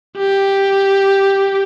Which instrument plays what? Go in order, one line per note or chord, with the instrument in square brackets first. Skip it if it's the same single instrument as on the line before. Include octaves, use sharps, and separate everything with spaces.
[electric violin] G4